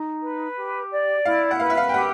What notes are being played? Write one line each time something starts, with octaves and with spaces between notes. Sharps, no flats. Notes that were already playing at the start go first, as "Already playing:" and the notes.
Already playing: D#4
B4
G4
D5
E4 F5
F#5
B4 F5
E5
F5
G5
G4 F#5